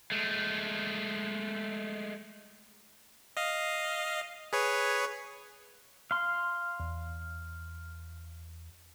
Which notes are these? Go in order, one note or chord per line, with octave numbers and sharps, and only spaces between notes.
G#3 A3
D#5 F5
G#4 B4 C#5
F5 C6
E2